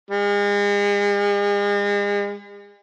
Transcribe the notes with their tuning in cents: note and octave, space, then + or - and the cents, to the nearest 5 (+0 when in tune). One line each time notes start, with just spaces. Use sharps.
G#3 -40